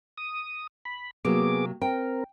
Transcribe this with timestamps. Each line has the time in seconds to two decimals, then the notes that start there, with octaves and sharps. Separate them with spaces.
0.18 D#6
0.85 B5
1.25 C3 F#3 A#3 B3 G#4 D6
1.82 C4 A#4 G5